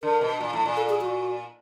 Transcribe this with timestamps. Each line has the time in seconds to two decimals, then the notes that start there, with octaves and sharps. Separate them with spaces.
0.03 D3 A#4
0.21 B2
0.41 A#2
0.53 A2
0.65 A#2
0.77 A4
0.89 G#4
1.01 F#4